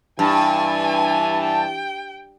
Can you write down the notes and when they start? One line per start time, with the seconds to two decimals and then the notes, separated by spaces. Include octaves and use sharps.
0.19 G2 E3 G#5 A5
1.43 G5